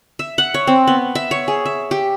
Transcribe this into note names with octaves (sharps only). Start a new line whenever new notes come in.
E5
F#5
C#5
C4
B3
E5
C#5
G#4
E5
G4